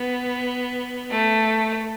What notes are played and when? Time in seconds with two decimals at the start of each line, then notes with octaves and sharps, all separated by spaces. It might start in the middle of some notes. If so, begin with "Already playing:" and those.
Already playing: B3
1.10 A3